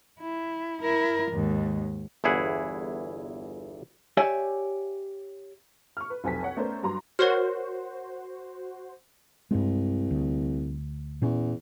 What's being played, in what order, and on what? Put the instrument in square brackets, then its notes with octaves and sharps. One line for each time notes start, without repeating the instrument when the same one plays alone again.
[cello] E4
E4 A#4
D#2 G#2
[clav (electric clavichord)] G1 E2 E4 G#4 F#5
[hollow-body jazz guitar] G4 C#5 D5 E5 G#5
[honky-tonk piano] C#6 F6
B4
F1 B1 C5 G#5 A5 B6
C#5 F#5
A3 B3 C#4 A#4 C5 D5
G2 F#3 A#5 C6
[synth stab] F#4 C5 [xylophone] A#4 C#5 F6
[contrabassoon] C2 [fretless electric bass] G2 G#3
[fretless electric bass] D2
[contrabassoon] E2 [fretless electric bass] A#2 C#4